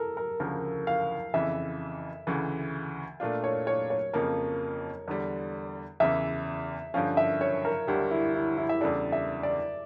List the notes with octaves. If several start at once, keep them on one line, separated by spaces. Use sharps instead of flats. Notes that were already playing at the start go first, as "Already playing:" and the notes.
Already playing: A4 A#4
A#4
D2 C#3 F3 A#4
F5
F2 C#3 E3 E5
D2 C#3 E3
A#2 A3 D4 F4
C#5
C#5
C#5
F2 C#3 F3 A#3 A#4
E2 D3 G3
E2 C#3 E3 E5
G2 D3 F3 C#4 F5
E5
C#5
A#4
D2 D3 G3 G4
E4
E4
E4
E5
E2 C#3 G3 D4 A4 D5
E5
D5